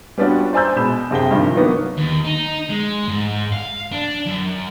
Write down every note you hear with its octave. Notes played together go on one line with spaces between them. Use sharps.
G3 B3 C#4 D4 F4 F#4
C5 D5 G#5 A#5 E6 G6
B2 G#3 B5 E7
F#2 C3 G#4 G5 G7
G2 C3 D#3 F3
F#3 A#3 B3 D#4 F#4
D#2
D#4
G#3
G#2
F5
D4
F#2